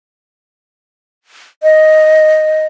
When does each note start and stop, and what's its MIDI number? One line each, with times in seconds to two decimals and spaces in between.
1.63 2.67 75